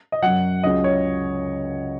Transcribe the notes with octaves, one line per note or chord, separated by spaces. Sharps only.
D#5
F#2 F#3 F#5
C#2 C#3 F#3 D#5
C#5